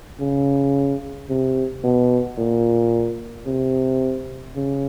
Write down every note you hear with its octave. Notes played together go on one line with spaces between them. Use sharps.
C#3
C3
B2
A#2
C3
C#3